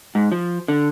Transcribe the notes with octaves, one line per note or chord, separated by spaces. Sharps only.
G#2
F3
D3